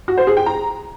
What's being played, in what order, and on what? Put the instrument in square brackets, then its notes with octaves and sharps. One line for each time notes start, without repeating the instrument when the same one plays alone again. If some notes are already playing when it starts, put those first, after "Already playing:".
[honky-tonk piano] F#4
C5
G#4
G5
A#5